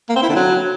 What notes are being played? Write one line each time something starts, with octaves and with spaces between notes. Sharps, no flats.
A#3
C4
E4
D3
F#3